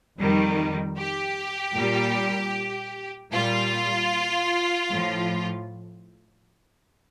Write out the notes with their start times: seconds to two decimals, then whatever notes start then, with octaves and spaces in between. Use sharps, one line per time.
0.19 F2 D#3 G3
0.97 G4
1.75 A#2 G3
3.33 A#2 G3 F4
4.90 A2 F3